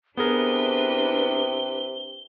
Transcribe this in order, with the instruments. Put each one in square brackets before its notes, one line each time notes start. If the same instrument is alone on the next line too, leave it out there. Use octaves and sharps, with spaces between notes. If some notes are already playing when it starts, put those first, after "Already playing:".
[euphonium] C3 [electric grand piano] B3 G#4 A#4 [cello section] D4 E4 B4 [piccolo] G7